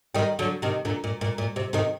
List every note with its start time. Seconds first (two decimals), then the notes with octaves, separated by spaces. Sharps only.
0.14 D#3 G3
0.39 D3 F#3
0.62 C3 D#3
0.85 A#2 D3
1.04 A#2
1.21 A#2
1.38 A#2
1.56 C3
1.73 C3 D#3